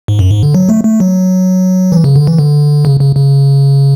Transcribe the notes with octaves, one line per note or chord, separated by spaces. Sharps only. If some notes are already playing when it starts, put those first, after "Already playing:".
G#2
F#2
G#2
D3
F#3
A3
A3
F#3
E3
C#3
D3
E3
D3
C#3
C#3
C#3